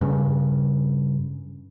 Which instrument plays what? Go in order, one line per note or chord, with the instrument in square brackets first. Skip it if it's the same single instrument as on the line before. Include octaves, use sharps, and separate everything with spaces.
[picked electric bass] G2 C#3